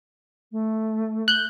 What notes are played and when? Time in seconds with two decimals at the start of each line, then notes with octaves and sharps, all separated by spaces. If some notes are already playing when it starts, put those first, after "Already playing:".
0.52 A3
1.28 F#6 G6